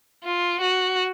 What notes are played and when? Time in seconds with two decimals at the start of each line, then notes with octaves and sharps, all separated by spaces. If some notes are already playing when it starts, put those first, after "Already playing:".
0.24 F4
0.61 F#4